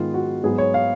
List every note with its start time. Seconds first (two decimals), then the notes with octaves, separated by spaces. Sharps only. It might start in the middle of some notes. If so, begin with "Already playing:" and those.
Already playing: G#2 D#3 G#3 B3 F4
0.14 F#4
0.44 G#2 F#3 B3 G#4
0.58 C#5
0.74 F5